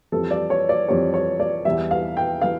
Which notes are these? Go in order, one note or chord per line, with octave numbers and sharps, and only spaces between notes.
F2 E3 G3 A4
D5
C#5
D5
F2 E3 G3 C#5
C#5
D5
E2 E3 G3 E5
F5
G5
E3 F5